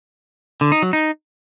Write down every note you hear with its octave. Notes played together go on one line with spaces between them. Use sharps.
D3
D#4
F#3
D#4